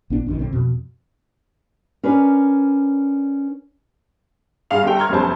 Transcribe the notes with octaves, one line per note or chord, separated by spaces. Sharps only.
A#1 B3 D4
A#1 F#2 D#3
B1 D3 C4
F2 B2
C#4 D4 A#4 B4
G2 G#4 F5 F7
G1 G3 A4 G5
A#5 C6 C#6 F6 G#6
F1 F#2 G3 B3 C5 A5